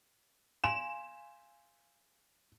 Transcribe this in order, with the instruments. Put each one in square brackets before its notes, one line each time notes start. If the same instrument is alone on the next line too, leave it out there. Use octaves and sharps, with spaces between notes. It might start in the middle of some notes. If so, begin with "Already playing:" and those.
[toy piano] F5 G#5 C6 [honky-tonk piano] E7